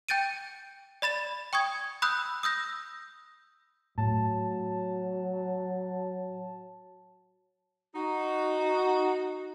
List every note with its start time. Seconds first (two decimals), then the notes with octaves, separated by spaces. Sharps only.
0.08 G5 G6 A6 D7 D#7
1.02 D5 B5 A6 E7
1.53 G5 C#6 D#6 G#6
2.02 B5 D#6 E6 F#6 G6
2.43 D#6 E6 G6 A#6
3.98 A2 F#3 A5
7.95 D#4 F#4